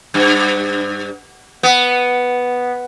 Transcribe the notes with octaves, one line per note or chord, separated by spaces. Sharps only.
G2
B3